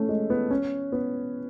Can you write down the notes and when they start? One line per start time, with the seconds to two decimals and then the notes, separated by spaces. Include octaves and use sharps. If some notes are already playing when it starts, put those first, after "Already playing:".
Already playing: A3 C#4
0.09 G#3
0.30 B3
0.51 C#4
0.92 B3